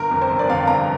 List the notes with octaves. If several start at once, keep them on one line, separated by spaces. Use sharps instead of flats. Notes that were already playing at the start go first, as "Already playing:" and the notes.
Already playing: G1 A#4
F2
C5
G1
D5
F2 F5
G1 A#5